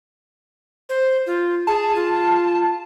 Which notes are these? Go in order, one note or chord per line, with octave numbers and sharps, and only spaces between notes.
C5
F4
G#4 A5
F4